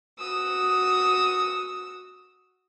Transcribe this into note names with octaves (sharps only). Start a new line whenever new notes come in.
F#4 D#6 E6